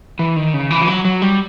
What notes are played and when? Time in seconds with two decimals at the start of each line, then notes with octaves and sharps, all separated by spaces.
0.19 E3
0.36 D#3
0.54 C#3
0.71 E3
0.81 F3
0.88 F#3
1.05 F#3
1.22 G3